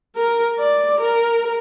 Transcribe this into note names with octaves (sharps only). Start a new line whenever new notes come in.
A#4
D5
A#4